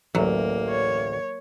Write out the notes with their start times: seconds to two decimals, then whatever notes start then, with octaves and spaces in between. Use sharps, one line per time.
0.15 A1 D2 F#3 A#3
0.69 C#5